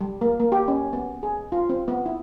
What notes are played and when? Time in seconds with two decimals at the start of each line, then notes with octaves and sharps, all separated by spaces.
0.01 G3
0.21 A#3
0.40 A#3
0.52 G4
0.68 C#4
0.93 B3
1.23 G#4
1.52 F4
1.69 C4
1.88 B3
2.06 E4